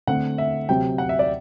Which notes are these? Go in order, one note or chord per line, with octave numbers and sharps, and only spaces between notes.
D3 A3 C4 F#5
E5
C3 F#3 C4 G5
F#5
E5
D5